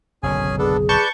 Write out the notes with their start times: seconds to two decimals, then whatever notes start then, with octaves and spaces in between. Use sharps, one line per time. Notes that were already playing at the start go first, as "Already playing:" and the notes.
0.23 F#1 B1 D3 C#4 G#4 G#5
0.59 B3 D4 G#4 A4
0.89 B4 D5 A5 C#6 G6